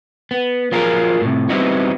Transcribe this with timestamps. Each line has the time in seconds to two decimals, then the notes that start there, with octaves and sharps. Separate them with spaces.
0.31 B3
0.72 F3 F#3 F4 G#4 A#4
1.21 A2 C3
1.49 G3 B3 C4 D#4 E4 F#4